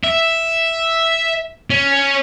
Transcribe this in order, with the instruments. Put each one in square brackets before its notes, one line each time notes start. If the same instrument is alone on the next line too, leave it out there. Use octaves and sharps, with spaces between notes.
[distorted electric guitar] E5
C#4